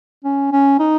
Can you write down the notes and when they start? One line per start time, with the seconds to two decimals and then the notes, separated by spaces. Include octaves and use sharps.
0.24 C#4
0.52 C#4
0.79 D#4